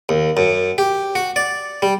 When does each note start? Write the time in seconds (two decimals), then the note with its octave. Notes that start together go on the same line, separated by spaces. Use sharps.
0.09 D#2
0.37 F#2
0.78 G4
1.15 F#4
1.36 D5
1.82 G3